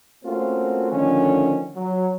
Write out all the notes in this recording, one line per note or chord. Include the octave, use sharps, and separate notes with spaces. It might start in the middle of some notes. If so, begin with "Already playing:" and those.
A3 A#3 C4 C#4 F4 F#4
D3 D#3 F3 A3 C#4
F#3